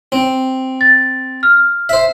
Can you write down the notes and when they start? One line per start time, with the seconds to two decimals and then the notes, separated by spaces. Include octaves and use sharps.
0.12 C4
0.81 A6
1.43 F6
1.89 C5 E5